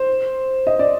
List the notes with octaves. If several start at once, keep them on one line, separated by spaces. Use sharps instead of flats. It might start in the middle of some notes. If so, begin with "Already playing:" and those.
Already playing: C5
D#5
D5